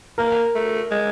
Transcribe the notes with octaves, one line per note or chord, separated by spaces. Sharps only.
A#3 A#4
A3
G#3